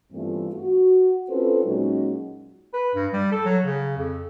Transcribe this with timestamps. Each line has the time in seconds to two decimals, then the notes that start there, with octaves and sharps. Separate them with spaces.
0.12 G2 E3 A3 B3 C4 F4
0.53 F#4
1.29 C4 C#4 F4 A4 B4 C5
1.63 A#2 F#3 G#3 C#4 D#4 F#4
2.73 B4
2.95 G2
3.13 G3
3.32 A4
3.45 F#3
3.65 C#3
3.97 F2